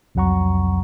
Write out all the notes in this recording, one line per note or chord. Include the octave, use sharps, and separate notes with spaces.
C2 F2 F#3 F#5 A#5 C#6